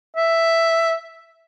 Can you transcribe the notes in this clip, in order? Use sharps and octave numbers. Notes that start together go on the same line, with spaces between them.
E5